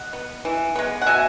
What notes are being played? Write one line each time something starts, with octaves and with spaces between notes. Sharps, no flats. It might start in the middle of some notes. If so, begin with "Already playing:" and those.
Already playing: D#5 F#5
B3
E3
G#3 B3
F#5
B2 E5 G#5